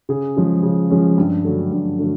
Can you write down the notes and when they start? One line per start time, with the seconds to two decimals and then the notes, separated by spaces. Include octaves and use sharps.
0.09 C#3 G#4
0.36 F3 G#3 C#4
0.63 C#3
0.90 F3 G#3 C#4
1.18 G2
1.45 D3 F#3 A3
1.72 G2
1.99 D3 F#3 A3